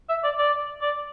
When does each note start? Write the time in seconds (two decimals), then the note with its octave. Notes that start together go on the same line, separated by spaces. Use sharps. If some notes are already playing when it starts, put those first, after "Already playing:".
0.09 E5
0.23 D5
0.38 D5
0.81 D5